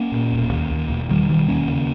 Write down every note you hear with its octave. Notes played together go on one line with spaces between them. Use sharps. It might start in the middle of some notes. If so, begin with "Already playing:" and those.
Already playing: A#3 C#4
A#2
E1
D#2
D#2
E1
E1 D#3 G3
E1 D#3 G3
D#2 A#3 C#4
C#3